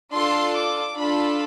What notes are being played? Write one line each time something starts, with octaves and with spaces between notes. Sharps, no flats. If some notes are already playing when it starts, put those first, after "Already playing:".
D4 F4 A4 C6
D6
D4 F4 A4 B5